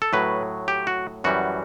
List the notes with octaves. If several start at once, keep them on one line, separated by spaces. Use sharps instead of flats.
A4
A2 F#3 B4
G4
F#4
F#2 E3 G3 F#4